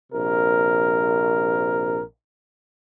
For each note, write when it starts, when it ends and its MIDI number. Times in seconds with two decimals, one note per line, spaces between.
0.13 2.01 34
0.13 2.01 48
0.13 2.01 70